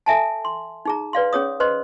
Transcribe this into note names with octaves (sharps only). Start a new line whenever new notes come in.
A4 E5 G#5 A5
C6
D#4 G#4 A#5
B4 D5 F5 C6
C#4 G#4 C#5 D#6
B4 C5 D#5 C6